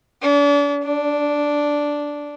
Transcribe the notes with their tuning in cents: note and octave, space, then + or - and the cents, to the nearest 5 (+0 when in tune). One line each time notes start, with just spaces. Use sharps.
D4 -40
D4 -5